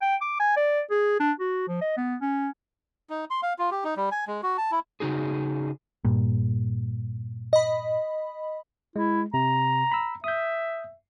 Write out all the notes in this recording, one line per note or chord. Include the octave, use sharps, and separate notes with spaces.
G5
D6
G#5
D5
G#4
D4
F#4
F3
D#5
B3
C#4
D#4
C6
F5
F4
G4
D#4
G3
G#5
G#3
F#4
A5
E4
C#3 D#4 F#4 G#4
G2 A#2
D#5 B5
G#3 E4
C3 A#5
B5 E6
E5 D#6 G6